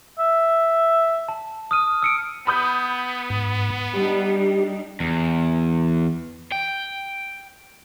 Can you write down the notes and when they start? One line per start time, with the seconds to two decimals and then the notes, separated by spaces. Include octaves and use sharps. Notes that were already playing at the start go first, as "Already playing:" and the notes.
0.19 E5
1.28 A5
1.71 D#6 F6 D#7
2.02 E6 C#7 D7
2.47 B3 B5 D#6 G6
3.30 G#2
3.93 G3 D4 D#4 G4
5.00 E2
6.52 G5